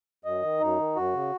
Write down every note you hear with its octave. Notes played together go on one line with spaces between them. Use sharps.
F#2 D#5
D#3
F#2 D#4
D#3
F#2 F#4
C#3